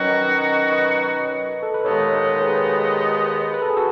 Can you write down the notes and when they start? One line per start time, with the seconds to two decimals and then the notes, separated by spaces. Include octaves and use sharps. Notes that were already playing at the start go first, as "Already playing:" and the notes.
Already playing: D#3 F#3 C#4 F#4 B4 D#5
0.72 B4 D#5
1.63 A4
1.74 B4
1.85 D#2 D#3 G#3 B3 D#4 A4 C#5
2.42 G#4 B4
3.54 B4
3.62 A4
3.70 G#4
3.77 F#4 A4